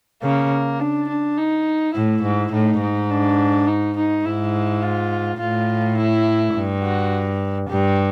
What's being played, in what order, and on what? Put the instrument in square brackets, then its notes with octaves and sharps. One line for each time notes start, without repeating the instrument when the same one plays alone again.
[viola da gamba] C#3 [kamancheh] A#3
[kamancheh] D4
D4
D#4
[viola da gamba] A2 [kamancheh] E4
[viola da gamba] G#2
[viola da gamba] A2 [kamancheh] D#4
[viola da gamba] G#2
[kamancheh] D4
D#4
D#4
[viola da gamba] G#2 [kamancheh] E4
[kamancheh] F4
[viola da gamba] A2 [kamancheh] F4
[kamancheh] E4
[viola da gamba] G2
[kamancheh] F#4
[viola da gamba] G2 [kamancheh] G4